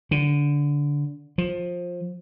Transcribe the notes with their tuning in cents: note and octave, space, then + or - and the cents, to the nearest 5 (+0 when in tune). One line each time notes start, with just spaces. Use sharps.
D3 -15
F3 +15